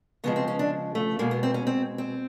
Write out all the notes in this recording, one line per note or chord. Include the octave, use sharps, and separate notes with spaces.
C#3 F3 G#3 B3
C4
C#4
D4
A3
B2 G#3 A#3
B3
C4
C#4
C4
C4